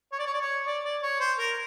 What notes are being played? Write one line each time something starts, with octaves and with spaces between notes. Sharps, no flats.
C#5
D5
C#5
D5
C#5
D5
D5
C#5
C5
A#4